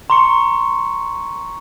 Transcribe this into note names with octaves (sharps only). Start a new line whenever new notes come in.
A#5 C6 C#6 C#7